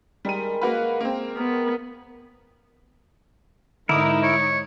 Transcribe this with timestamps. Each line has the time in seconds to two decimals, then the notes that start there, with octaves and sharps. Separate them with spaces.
0.25 D#3 G3 G#3 A#4 D#7
0.61 A#3 F#4 B4 F5
1.01 A#3 C4
1.37 B3 A#4
3.89 G#2 D3 D#4 E4 A#4 D6 D#6
4.24 C#5